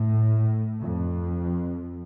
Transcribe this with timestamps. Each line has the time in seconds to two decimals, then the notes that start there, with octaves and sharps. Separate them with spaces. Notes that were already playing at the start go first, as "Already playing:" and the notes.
Already playing: A2
0.81 F2